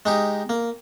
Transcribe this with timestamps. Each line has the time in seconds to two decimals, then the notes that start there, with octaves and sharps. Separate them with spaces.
0.06 G#3 D#4 G4
0.49 A#3